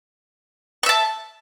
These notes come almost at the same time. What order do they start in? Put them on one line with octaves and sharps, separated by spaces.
C#6 E5 A5